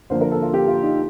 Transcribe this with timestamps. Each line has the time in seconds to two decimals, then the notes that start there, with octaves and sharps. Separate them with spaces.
0.10 D3 F3 A#3 C5
0.21 A#4
0.32 A4
0.42 F4
0.53 G4
0.67 F4
0.83 D#4